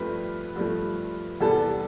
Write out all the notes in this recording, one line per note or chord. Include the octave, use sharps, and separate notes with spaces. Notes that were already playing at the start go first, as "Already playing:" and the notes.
Already playing: G2 F3 A3 C4 B4
G2 F3 A3
E2 C3 G3 B3 A4